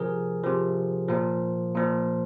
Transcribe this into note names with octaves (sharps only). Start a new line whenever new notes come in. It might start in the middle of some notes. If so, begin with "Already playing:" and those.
Already playing: C3 F3 G#4 A#4
C3 F3
A#2 F3
A#2 F3